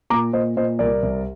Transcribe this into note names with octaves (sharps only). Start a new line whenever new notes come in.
A#2 A#5 D6
A#2 C5 D#5
A#2 C5 D#5
C2 A#4 D5
C2